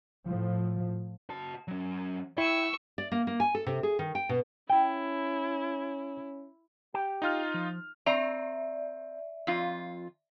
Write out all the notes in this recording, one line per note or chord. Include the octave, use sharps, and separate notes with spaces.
A2 F3
F#4 A5
F#3 C#4
E4 G5 C#6 E6
D5
A#3
A#3
G#5
A4
C3
G#4
D#3
G5
B2
C#4 E4 G5
G4 G5
D#4 F4 F6
F3
C4 D5 E5 A#5
F2 F4